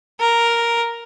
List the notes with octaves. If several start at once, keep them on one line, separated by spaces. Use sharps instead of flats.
A#4